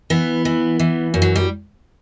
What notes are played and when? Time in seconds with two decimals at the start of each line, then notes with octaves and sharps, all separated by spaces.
0.10 E3 B3
0.45 E3
0.79 E3
1.14 F#2
1.22 F#3
1.36 G3